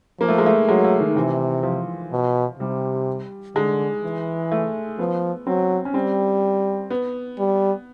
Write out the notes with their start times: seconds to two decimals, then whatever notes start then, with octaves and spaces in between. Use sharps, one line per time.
0.20 F3 A#3
0.28 A3
0.38 G#3
0.46 A3
0.67 F#3 G#3
0.84 A3
1.00 D#3
1.16 C3 E3
1.63 F3
2.12 B2
2.59 C3 G3
3.55 D3 G#3
4.03 E3
4.52 A3
4.99 F3 B3
5.47 F#3 C4
5.85 C#4
5.94 G3 C4
6.90 B3
7.39 G3